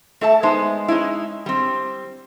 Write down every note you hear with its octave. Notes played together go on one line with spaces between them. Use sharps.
A3 A4 E5 A5
G#3 B3 D#4 C5
G#3 C#4 D#4 E4
G3 C4